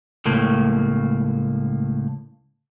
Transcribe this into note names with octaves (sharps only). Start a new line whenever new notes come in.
C#2 A2 A3 A#3